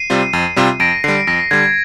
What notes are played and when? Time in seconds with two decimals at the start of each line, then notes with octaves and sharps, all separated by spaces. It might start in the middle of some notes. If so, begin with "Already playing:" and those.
Already playing: C7 D#7
0.10 C3 G3 C4 F4
0.33 F2
0.56 C3 G3 C4 F4
0.80 F2 A#6 D7
1.04 D3 G3 C7
1.27 F2 A#6
1.51 D3 G3 G#6